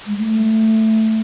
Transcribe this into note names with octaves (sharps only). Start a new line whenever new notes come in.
G#3
A3